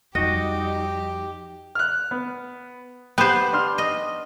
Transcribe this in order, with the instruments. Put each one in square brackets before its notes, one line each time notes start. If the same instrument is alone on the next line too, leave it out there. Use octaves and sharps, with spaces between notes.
[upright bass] F2 F3 [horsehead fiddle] G3 D#4 [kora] F#4 D#5 [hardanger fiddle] G4
[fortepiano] F6 F#6
B3
[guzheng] B3 C5 [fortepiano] G4
[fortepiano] D4 C6 F6
[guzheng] D#5